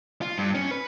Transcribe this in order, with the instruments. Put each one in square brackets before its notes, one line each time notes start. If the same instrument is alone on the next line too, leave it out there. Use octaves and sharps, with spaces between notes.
[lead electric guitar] F4
G2
C#4
B4